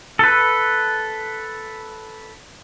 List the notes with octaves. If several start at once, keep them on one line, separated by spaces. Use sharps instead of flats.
A4 B4